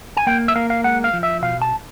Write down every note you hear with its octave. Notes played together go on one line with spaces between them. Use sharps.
G#5
A#3 G5
E5
A#3 F5
F5
G#3 F#5
F5
F3
E5
B2 F5
A5